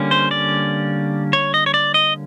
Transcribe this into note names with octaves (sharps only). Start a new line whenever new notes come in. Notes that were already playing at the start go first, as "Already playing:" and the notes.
Already playing: D3 G3 A#3 C#4
C5
D5
C#5
D#5
C#5
D5
D#5